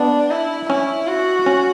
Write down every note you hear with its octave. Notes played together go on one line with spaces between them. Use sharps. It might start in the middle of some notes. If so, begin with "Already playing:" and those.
Already playing: B3 D4
E4
C#4 E4
F#4
C#4